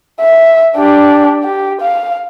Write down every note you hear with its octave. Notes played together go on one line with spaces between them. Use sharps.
E5
D4 G4
G4
F5